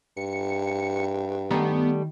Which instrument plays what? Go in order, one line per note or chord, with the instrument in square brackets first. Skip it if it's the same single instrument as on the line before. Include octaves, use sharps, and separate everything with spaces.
[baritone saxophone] G2 [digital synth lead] C#7
[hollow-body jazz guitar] D#3 A#5 B5 [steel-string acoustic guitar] G3 A3 [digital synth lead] B3